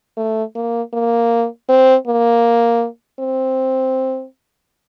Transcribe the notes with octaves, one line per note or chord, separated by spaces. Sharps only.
A3
A#3
A#3
C4
A#3
C4